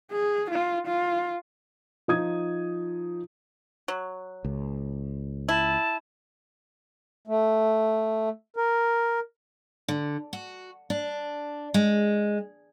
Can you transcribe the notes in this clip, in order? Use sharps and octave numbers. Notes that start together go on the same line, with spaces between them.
G#4
F4
F4
F3 D#4 D#6 G#6
F#3
C#2
E4 A5
A3
A#4
D3
F#4
D4
G#3